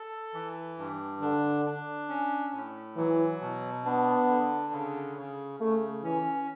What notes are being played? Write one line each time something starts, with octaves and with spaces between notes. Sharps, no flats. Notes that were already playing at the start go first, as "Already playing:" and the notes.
Already playing: A4
E3
G2
D3 D4
D4
C#4
A2
E3 F#3
B2
B3 D4
D3
C#3
C#3
C#3 A3
E3 C#4